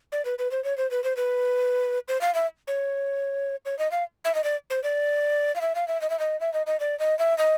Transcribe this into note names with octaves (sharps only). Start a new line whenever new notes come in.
D5
B4
B4
C5
C#5
C5
B4
C5
B4
C5
F5
E5
C#5
C#5
D#5
F5
E5
D#5
D5
C5
D5
F5
E5
F5
E5
D#5
E5
D#5
E5
D#5
D#5
D5
D#5
E5
D#5